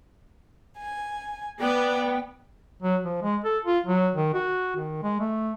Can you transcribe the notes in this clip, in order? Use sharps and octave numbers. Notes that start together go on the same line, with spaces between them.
G#5
B3 D5 G5
F#3
F3
G#3
A4
F4
F#3
D#3
F#4
D#3
G#3
A3